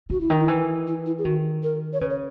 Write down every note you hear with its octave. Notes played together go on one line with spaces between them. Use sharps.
C#3 F#4
E4
D#3 D#4
E4
E3
E4
E4
G#4
D#3 F#4
A#4
C#5
C#3 B4
C#5